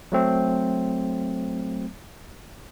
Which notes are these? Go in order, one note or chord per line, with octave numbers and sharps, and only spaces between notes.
F#3 A3 C4